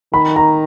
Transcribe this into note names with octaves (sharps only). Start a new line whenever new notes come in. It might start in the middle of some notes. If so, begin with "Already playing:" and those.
D#3 B5
A#5